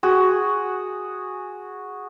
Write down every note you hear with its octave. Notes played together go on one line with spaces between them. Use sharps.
F#4 G#4